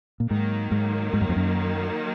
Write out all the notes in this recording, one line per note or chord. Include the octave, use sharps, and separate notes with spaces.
A#2
G#2 D#3 F#3 A#3
G#2
G#2
F#2
F2
F#2